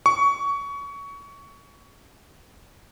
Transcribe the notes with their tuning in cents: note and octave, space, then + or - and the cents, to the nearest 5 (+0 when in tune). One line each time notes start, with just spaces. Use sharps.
C#6 +20